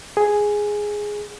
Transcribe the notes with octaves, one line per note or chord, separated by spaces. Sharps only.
G#4